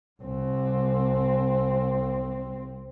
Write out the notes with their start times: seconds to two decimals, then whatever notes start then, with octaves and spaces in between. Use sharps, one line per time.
0.22 C2 C4